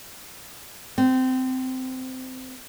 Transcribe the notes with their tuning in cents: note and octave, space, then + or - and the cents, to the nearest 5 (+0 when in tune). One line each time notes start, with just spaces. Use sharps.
C4 -20